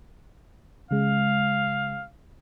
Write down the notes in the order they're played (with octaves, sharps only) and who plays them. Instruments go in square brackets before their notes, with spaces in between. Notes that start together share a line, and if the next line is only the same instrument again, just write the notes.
[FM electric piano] C#3 G#3 [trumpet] F5